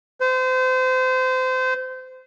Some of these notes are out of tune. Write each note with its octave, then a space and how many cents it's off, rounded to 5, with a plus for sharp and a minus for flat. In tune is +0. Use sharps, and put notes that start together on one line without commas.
C5 -30